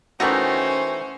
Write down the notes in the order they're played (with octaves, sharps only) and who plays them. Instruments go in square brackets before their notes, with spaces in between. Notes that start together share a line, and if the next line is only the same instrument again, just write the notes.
[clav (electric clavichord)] E3 A3 D#4 [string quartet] C#4 C5 [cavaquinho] F#4 A#4 G5